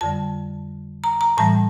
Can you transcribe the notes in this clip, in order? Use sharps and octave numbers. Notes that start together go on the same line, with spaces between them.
F2 D3 G3 A5
A#5
A#5
A2 E3 G3 A5